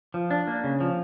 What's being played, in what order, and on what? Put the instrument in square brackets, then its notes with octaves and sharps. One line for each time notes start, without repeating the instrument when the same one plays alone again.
[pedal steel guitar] F3
D4
A#3
C#3
F3